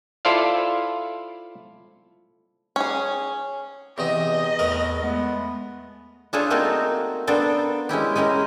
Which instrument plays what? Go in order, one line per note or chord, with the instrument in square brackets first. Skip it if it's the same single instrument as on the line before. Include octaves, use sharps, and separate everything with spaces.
[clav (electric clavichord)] E4 F4 A4 C5 D5 F5
[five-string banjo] C#4 G#4
[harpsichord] E2 C3 D#4 [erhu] D#5
[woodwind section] E2 [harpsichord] A2 A#4 B4
[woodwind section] G#3 A3 B3
[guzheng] D4 F4 G#4 A4 C5 C#5
A3 A#3 C4 D#4 F#4 A#4
A#3 B3 D4 A4 C5 G5
G#3 C#4 E4 G4
G#3 C#4 G4 A#4